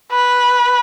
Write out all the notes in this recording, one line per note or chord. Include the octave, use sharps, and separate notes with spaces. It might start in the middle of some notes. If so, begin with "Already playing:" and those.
B4